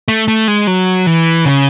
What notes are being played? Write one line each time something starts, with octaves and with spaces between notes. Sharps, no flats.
A3
A3
G#3
F#3
E3
C#3